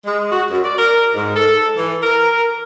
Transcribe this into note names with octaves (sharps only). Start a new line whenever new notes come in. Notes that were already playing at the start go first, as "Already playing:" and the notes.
G#3
F#4
F#2
D5
A#4
G#2
A4
E3
A#4